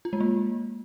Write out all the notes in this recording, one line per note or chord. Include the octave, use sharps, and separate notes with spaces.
F4
G#3
A#3